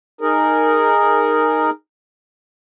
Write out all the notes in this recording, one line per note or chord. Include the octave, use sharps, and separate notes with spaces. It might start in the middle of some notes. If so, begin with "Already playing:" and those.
D#4 G#4 A#4